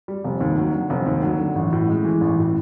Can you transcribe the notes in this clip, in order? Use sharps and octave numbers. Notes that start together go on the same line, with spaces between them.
G3
F1
D#2
F#3
D3
F1
D#2
F#3
D3
A1
A2
G#3
E3
A1
A2